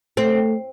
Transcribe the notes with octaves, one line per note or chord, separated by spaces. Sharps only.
A3 C4